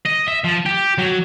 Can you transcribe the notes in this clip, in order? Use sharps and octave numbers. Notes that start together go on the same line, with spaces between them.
D#5
E5
F3
G4
F#3